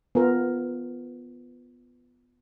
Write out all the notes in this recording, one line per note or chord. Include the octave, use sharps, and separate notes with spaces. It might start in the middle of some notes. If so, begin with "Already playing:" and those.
B3 F4 A#4